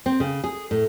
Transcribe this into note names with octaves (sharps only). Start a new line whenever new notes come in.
C4
C#3
G#4
A2